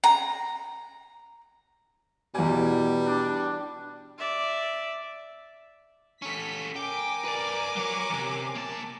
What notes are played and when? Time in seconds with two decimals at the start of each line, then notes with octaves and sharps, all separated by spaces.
0.04 A#5
2.35 E2 B2 G3 G#5
3.06 D4
4.18 D5 E5
6.22 C#4 A4 B6
6.76 A#4 G5 G#5 D6
7.24 B4 D5
7.76 F#3 C#5
8.09 E2 C3
8.55 A#3 A5